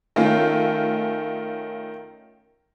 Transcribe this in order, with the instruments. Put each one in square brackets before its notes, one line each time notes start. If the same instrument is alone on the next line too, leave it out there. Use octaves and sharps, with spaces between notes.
[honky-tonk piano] D#3 A3 C#4 F4